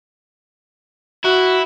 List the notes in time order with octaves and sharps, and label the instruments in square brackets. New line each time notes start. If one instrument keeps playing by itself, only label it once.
[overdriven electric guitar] E4 [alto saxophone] F#4